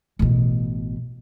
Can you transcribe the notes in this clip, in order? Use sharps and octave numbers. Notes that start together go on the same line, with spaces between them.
A1 B2